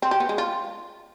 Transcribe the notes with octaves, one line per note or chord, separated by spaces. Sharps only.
C4
G4
B3
G#3
F4